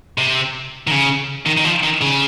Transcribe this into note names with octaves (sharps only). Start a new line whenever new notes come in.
C3
D#3
C#3
D#3
D#3
F3
D#3
C#3